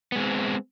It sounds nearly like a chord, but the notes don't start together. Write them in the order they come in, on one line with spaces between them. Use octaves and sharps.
B3 G#3 C4